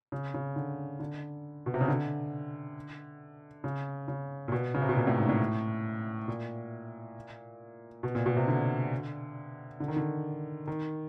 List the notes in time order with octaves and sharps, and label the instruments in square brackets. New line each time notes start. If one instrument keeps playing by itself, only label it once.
[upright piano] C#3
C#3
D3
D3
B2
C3
C#3
D3
C#3
C#3
A#2
B2
C#3
C3
B2
A#2
A2
G#2
A2
A#2
B2
A#2
B2
C3
D3
D3
D#3
D3
D#3